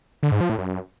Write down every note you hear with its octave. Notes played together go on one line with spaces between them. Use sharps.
D3
G#2
F3
A2
F#2